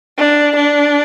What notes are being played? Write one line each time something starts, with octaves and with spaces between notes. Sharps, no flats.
D4
D4